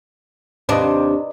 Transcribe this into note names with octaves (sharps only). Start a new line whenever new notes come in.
D#2 C3 D4 B4 D5 D#5